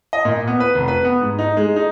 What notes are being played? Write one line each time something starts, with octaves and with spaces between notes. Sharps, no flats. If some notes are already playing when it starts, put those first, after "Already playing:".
D#5
A#2
B3
B4
F1
B4
B3
G#2
D#4
G#3
D#4